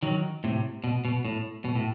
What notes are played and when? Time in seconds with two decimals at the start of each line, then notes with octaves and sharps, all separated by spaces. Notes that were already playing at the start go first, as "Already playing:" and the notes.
0.03 D#3 F#3
0.44 A2 C3
0.84 B2
1.05 B2
1.25 A2
1.65 B2
1.75 A2